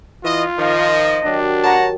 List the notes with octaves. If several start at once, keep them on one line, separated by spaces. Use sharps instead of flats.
E3 F4 D#5
D#3 F3 D#5
D#3 F#3 D4 G4
C#5 F#5 A5 A#5